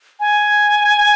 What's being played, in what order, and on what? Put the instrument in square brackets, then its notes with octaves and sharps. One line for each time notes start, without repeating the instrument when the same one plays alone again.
[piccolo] G#5